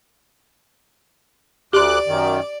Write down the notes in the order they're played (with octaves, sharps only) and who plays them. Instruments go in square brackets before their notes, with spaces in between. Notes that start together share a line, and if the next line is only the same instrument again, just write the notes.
[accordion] D2 D6 F#6 [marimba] G4 C6 [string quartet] D5
[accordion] F#2 D#3